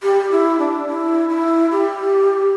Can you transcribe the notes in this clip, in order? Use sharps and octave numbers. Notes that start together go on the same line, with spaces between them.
G4
E4
D4
E4
E4
G4